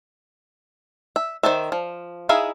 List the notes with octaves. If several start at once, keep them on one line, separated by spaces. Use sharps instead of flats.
E5
D#3 C5 D5 E5
F3
D#4 E4 G#4 E5 F5